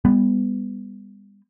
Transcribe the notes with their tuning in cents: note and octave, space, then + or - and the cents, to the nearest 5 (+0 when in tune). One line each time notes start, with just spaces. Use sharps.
G3 +35 B3 +0